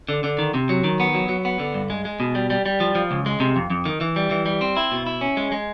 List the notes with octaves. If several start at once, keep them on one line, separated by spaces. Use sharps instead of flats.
D3
D3
D#3
C3
F#3
D#3
B3
F#3
F#3
B3
D3
G2
G#3
G#3
B2
G3
G3
G3
F3
F3
C#2
G#3
C3
F2
F2
D#3
E3
G3
E3
G3
C4
E4
B2
E4
C#4
G#3
G#3